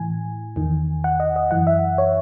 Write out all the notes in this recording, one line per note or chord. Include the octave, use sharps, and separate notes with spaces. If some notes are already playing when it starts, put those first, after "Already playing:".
Already playing: A2 E3 G#5
E2 D#3
F#5
D#5
D#5
F#2 E3 F#5
E5
C#5